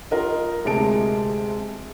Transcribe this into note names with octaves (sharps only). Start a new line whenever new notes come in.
F4 A#4 D#5
D2 C3 G#3 A5 D7